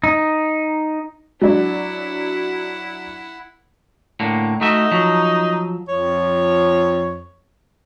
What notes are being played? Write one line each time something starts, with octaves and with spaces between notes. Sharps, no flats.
D#4
F#3 D4 E4 F#5
A2 D3 A#3
A3 D#4 F#4 E5
F3 F#3
F2 F3 C#5